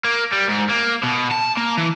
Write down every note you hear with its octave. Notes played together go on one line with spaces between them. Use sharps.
A#3
G3
G#2
A#3
B2
A5
A#3
E3